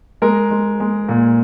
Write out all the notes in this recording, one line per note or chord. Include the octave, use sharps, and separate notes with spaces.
G#3 A#4
G#3
G#3
A#2